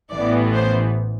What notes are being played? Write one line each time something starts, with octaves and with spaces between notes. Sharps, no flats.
A1 A2 E3 B3 D5
C5